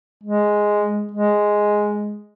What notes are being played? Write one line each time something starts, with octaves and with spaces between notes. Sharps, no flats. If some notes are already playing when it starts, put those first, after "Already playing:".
G#3
G#3